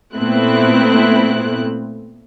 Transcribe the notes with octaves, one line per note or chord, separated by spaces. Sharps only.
A#2 A3 B3 C4 E4 F#6